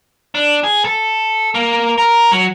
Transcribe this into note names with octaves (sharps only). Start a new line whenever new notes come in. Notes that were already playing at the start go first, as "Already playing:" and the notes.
D4
G#4
A4
A#3
A#4
F#3